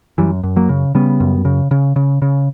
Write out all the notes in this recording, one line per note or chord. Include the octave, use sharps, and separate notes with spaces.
F#2 E3 G3
F#2
F#3 A#3
C#3
C#3 G3 B3
F#2
C#3
C#3
C#3
C#3